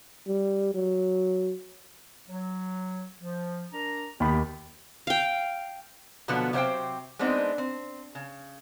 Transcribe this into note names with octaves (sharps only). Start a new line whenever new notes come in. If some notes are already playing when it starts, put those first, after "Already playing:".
G3
F#3
F#3
F3
D4 A#4 A#5
D#2 B3 G4 B5
F5 G5
B2 D3 F3 F#3 B3
C3 F#3 C5 F5 G5
G#3 B3 C4 D4 D#4
C4
C#3